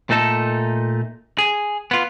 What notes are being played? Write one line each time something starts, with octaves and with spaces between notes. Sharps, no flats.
A#2 A3 D#4 A4
G#4
B3 F4